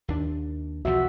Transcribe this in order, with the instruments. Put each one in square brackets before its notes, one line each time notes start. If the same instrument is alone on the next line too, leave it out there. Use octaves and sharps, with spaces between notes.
[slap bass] D#2 D4
[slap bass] B1 E2 F3 [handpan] F#4 E5